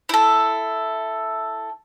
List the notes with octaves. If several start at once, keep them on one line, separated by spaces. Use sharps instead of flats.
E4 A4